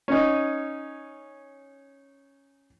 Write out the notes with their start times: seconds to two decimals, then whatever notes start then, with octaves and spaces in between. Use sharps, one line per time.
0.08 C#4 D#4